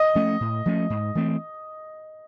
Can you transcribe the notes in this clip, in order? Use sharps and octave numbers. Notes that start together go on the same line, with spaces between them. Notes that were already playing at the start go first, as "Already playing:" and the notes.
Already playing: D#5
F3 A3 C#4
A2
F3 A3 C#4
G#2
E3 A3 C4